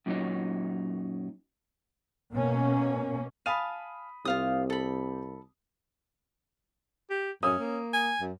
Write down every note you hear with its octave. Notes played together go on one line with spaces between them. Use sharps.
F#2 A#2 D3 F#3 D#4
B2 A#3 C#4
F5 G#5 A5 B5 D#6 D#7
C2 C4 F4 G4 F5 D#6
A4 B5
G4
F#2 C#4 D#6
A#3
G#5
F#2